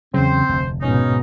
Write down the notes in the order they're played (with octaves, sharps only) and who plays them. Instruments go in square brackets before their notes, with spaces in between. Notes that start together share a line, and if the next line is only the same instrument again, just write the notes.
[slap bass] E2 F#3 [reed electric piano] C#3 [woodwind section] C4 C5
[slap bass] F1 [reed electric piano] D2
[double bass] G#2 B2 [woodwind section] C#4 D#4